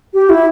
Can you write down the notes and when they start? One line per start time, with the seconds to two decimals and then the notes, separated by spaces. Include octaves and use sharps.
0.14 G4
0.30 E4